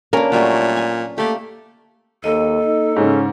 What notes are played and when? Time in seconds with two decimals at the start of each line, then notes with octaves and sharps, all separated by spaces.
0.13 A#3 C#4 D4 F#4 A#4 B4
0.32 A#2 F#3 G3 A3
0.77 G#5
1.18 A3 A#3 G4
2.24 D#2 A#3 A4 D#5
2.64 D#4
2.96 G#2 C#3 C#4